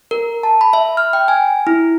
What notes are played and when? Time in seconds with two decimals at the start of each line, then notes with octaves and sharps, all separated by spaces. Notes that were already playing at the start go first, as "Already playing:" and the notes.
0.11 A#4
0.43 A5
0.61 B5
0.73 E5
0.97 F6
1.13 G5
1.28 G#5
1.67 E4